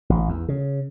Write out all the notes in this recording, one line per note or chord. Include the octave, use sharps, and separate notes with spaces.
A1
E2
C#3